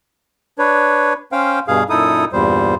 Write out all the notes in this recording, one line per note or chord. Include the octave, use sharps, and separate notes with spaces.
D4 B4 C#5
C#4 C5 F5 G5
G2 B2 G#4 F5
F#2 A#2 D#4 E4 A4 D#6
E2 G2 A#2 G3 C5